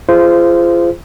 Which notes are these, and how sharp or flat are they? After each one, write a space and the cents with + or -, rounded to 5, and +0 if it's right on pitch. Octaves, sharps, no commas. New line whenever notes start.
F4 -30 G#4 +5 C5 -15